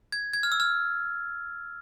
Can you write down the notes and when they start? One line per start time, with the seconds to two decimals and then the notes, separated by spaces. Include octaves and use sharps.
0.12 G#6
0.33 G#6
0.43 F6
0.52 E6
0.60 F6